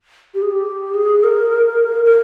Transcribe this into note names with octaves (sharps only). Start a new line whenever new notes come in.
G4
G#4
G4
G#4
A#4
A#4